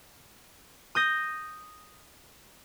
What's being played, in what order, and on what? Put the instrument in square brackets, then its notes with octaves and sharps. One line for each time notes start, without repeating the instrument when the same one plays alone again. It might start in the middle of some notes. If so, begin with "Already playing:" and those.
[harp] D#6 G6 A#6